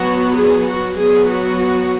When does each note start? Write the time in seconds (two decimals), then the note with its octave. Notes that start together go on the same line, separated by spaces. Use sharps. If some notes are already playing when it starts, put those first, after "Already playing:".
Already playing: F#3 B3 F#4
0.36 G#4
0.66 F#4
0.97 F#3 B3 G#4
1.29 F#4